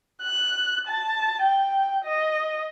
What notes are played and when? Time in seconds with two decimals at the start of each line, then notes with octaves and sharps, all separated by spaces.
0.22 F#6
0.88 A5
1.42 G5
2.05 D#5